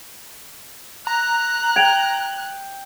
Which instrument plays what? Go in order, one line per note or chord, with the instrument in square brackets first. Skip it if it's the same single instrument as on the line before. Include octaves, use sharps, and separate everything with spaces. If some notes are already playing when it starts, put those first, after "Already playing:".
[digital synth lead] A#5 [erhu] F#6
[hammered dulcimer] G5 [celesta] G#6 D7 F7